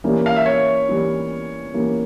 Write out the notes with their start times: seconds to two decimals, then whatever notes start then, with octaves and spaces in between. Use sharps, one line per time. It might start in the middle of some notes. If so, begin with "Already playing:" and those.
0.04 E3 G3 A#3 C#4 E4
0.26 F5
0.36 E5
0.46 C#5
0.89 E3 G3 A#3 C#4 E4
1.74 E3 G3 A#3 C#4 E4